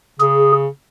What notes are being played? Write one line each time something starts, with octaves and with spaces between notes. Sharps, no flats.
C#3 G#4